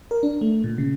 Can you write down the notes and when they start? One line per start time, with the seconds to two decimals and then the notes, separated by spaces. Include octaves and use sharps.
0.11 A#4
0.23 D4
0.41 A3
0.64 A#2
0.78 C#3